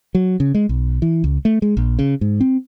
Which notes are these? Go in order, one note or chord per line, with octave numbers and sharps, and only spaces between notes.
F#3
C#3
G#3
B1
E3
C#2
A3
G#3
A#1
C#3
G#2
C4